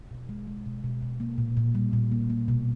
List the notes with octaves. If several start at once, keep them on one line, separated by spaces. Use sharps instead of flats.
B2
G#3
G#3
B2
B2
B2
A#3
A#2
A#2
G3
A#2
A#3
A#3
B2